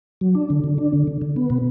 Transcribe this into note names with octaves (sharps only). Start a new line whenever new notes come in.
F#3
D4
D3
D3
D4
D3
D3
D3
B3
B2